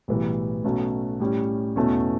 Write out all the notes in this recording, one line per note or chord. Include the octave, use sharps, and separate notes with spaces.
B1 A2 E3 G3
B1 B2 A3 C#4
A2 G3 C#4
E2 B2 A3 C#4